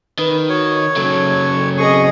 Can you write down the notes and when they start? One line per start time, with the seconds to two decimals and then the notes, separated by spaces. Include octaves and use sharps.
0.19 D#3 B4
0.49 F#4 C#5
0.96 C#3 F#3 A4
1.78 C4 G#4 D#5 C#6